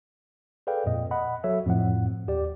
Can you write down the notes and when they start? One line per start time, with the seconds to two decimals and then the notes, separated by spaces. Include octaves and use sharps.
0.67 G#4 A4 B4 D5 F5 G5
0.86 F2 A#2 D#5
1.11 D#5 F#5 B5
1.44 F#3 F#4 A4 C#5 E5
1.66 F2 A2 F3 F#5
2.27 D#2 G4 D5